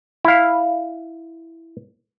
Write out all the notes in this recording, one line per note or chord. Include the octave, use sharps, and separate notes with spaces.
E4 F5